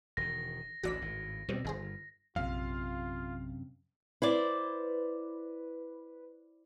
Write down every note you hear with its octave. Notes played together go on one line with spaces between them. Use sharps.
E1 D#3 A#6
A1 D2 A#2 F#4 D5 B6
G#1 A2
D#2 B2 G3 C4
G1 D#3 G#4 C5
A#1 F#2 C3 F4 F5
E4 B4 C5 D5